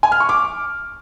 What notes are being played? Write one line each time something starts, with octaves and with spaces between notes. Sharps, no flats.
G#5
F6
C#6
D6